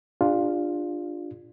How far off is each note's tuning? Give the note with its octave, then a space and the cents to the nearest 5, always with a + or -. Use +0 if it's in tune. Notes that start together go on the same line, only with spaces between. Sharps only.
D4 +15 F4 +0 G#4 -45